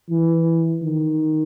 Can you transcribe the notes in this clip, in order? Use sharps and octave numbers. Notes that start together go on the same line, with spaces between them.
E3
D#3